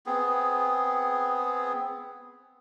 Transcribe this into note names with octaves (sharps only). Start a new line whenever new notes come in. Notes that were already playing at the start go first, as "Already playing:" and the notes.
B3 C4 G#4